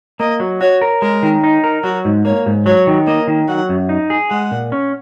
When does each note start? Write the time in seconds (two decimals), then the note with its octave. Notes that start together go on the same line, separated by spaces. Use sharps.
0.20 A#3 D#5
0.40 F#3
0.61 F#4 C#5
0.82 A#4
1.02 G#3 A#4
1.23 D#3
1.44 D#4
1.64 A#4
1.84 F#3 F#4
2.05 G#2
2.25 A#3 C#5
2.46 G#2
2.66 F#3 C#5
2.87 D#3
3.07 A#3 D#5
3.27 D#3
3.48 F#3 F#5
3.69 F#2
3.89 D#4
4.10 G#4
4.31 G#3 F#5
4.51 A#2
4.72 C#4